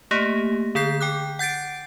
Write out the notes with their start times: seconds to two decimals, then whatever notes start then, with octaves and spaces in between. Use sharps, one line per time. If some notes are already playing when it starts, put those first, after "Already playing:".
0.11 A3 A#3 G4
0.75 D3 G#4 G6 C7
1.01 G5 D6 F#6
1.39 F#5 G6 A6 C7 D7